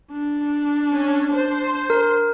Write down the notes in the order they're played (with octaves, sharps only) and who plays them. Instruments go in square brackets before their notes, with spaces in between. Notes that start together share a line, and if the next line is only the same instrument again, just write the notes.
[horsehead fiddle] D4
[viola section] C#4
C5
[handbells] A#4